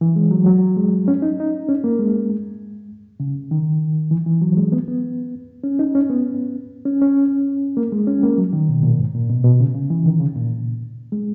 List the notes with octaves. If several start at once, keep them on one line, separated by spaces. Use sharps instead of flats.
E3
G#3
F#3
F#3
G#3
C#4
D#4
D#4
C#4
A#3
G#3
C#3
D#3
E3
E3
F#3
G#3
B3
B3
C#4
D#4
C#4
B3
C#4
C#4
A#3
G#3
C#4
A#3
F#3
D#3
B2
A#2
G#2
A#2
B2
B2
C#3
C#3
E3
D#3
C#3
A#2
G#3